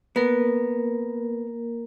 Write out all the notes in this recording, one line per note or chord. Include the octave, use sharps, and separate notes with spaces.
A#3 B3 A#4